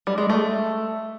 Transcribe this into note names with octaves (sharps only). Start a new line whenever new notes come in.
G3
G#3
A3